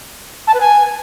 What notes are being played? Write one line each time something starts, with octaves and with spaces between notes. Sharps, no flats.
A5
B4
G#5